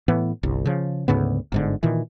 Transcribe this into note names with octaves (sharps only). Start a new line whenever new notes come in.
A2 E3 B3
G1 C2
C#3 F3
D2 G#2 C#3 B3
G1 G#2 D3
A#2 D#3 E3